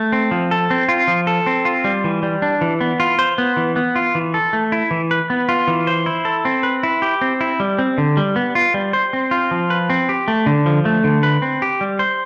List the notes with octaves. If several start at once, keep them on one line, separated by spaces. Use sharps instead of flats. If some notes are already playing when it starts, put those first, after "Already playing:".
Already playing: A3
C4
F3
A4
C4
F4
F3
A4
C4
F4
G3
E3
G3
D4
E3
B3
F4
C5
B3
E3
B3
F4
E3
A4
A3
E4
E3
B4
B3
F4
E3
C5
E4
A4
C4
B4
E4
G4
C4
E4
G3
C4
D3
G3
B3
F4
G3
C5
C4
F4
F3
B4
C4
G4
A3
D3
F3
A3
D3
B4
C4
G4
G3
C5